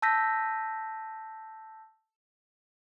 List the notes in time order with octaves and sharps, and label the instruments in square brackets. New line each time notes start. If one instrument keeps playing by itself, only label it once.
[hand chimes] A5 E6 G6 A#6 B6